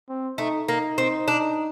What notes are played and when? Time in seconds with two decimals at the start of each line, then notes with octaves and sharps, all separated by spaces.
0.09 C4
0.38 A3 D#4
0.68 A#3 D#4
0.98 C4
1.28 D4